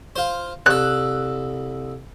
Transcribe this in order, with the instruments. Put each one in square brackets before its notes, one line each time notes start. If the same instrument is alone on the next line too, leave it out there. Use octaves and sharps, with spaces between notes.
[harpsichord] F4 C5
[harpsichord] C2 A4 [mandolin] F#6